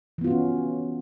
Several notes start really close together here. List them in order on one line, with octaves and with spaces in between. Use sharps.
E3 B3 F4 F#4 C#4